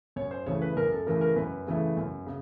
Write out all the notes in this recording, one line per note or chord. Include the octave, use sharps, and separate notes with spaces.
F#2 C#5
C5
C#3 E3 A3 C#5
B4
F#2 A#4
A4
C#3 E3 A3 A#4
A#4
F#2 B4
C#3 E3 A3
F#2
C#3